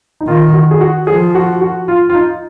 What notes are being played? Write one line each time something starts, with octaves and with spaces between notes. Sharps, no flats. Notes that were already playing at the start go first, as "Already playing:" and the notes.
D#4
D#3 F4
F#4
G#4
F#4
F3 G#4
F#4
F#4
F4
F4
D#4